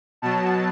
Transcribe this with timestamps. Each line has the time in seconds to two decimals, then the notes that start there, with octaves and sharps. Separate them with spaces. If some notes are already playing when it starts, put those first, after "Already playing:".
0.22 B2 F#3 A5